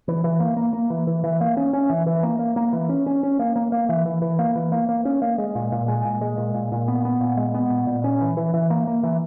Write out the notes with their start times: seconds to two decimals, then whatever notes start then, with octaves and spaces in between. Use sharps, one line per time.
0.08 E3
0.24 E3
0.40 A#3
0.57 A#3
0.73 A#3
0.90 E3
1.07 E3
1.24 E3
1.41 A#3
1.57 C#4
1.73 C#4
1.89 E3
2.06 E3
2.23 A#3
2.39 A#3
2.56 A#3
2.73 E3
2.89 C#4
3.06 C#4
3.23 C#4
3.39 A#3
3.56 A#3
3.72 A#3
3.89 E3
4.06 E3
4.22 E3
4.39 A#3
4.56 E3
4.72 A#3
4.89 A#3
5.05 C#4
5.22 A#3
5.38 G#3
5.55 A#2
5.72 A#2
5.88 G#3
6.05 A#2
6.21 G#3
6.37 A#2
6.54 A#2
6.72 A#2
6.88 B3
7.05 B3
7.21 A#2
7.37 G#3
7.54 B3
7.70 A#2
7.87 A#2
8.04 C#4
8.21 E3
8.37 E3
8.54 E3
8.70 A#3
8.87 A#3
9.03 E3